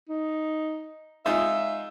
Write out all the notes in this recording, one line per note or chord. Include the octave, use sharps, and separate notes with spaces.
D#4
G#3 D#4 F4 E5